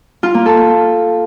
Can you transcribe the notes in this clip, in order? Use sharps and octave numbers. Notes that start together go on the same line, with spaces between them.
F4
A#3
A4